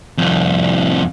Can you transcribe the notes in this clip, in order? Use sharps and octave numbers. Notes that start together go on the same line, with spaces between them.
C2 F2